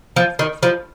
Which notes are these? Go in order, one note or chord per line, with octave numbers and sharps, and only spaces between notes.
F3
D#3
F3